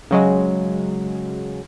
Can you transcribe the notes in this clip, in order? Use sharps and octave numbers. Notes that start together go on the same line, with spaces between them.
C#3 F#3 G#3